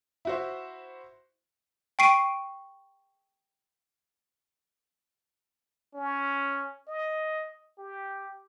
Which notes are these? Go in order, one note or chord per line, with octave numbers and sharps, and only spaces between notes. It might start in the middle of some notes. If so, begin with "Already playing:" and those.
E4 F#4 C5
G5 C#6 C7 D7 D#7
C#4
D#5
G4